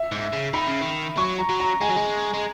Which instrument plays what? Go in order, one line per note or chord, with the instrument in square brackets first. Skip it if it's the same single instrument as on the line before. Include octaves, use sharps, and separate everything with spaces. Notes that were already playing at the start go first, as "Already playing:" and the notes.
Already playing: [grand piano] E5
[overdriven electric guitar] G#2
C#3
[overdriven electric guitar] D#3 [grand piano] B5
[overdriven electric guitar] C#3
D#3
[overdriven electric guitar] F#3 [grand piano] C#6
[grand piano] A#5
[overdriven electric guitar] F#3
[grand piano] A#5
[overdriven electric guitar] G#3 [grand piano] G#5
[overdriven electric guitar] F#3
G#3
G#3